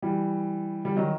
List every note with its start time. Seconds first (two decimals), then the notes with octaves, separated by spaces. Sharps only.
0.02 E3 G3
0.85 G3
0.96 D#3 F#3